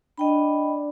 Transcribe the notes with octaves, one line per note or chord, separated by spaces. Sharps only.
D4 D#5 G5 B5